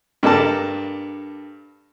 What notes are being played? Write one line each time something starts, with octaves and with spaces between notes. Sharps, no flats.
G2 A#3 D4 A4 A5